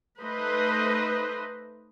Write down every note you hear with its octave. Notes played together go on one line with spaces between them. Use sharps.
A3 D#4 B4 C5 D#5